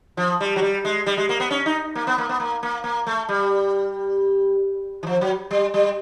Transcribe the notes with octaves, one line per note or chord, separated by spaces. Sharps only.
F3
G3
F#3
G3
G#3
G3
G#3
A#3
B3
C#4
D#4
A#3
B3
A#3
B3
A#3
A#3
A#3
A3
G3
E3
F3
F#3
G3
G3